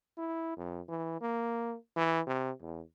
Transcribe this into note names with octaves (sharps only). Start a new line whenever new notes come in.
E4
F2
E3
A#3
E3
C3
E2